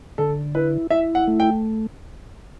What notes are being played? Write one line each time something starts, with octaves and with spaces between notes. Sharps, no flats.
D3 A4
E4 B4
E4 E5
F#5
A3
G5